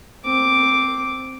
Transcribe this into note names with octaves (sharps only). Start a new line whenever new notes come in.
C4 D6